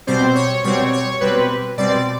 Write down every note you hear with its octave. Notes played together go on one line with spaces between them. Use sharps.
B2 G3 C4 C5
C#5
B2 G3 C4 C#5
C#5
B2 G3 C4 B4
B2 G3 C4 D5